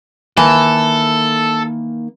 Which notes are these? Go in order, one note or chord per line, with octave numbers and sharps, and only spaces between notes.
D#3 E3 A#3 A4